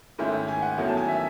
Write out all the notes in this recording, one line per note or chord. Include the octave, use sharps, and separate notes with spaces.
G#2 D#3 A3 C#4 E4
G#5
F#5
E2 D#3 F#3 A3 C#4
A5
G#5
E5